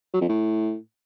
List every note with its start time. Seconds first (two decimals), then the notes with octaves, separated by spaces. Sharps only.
0.13 F#3
0.21 F2
0.29 A2